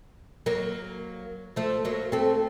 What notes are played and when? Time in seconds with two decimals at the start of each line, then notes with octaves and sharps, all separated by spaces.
0.46 F#3 A#3
1.56 F3 A3
1.85 F#3 A#3
2.12 A3 C4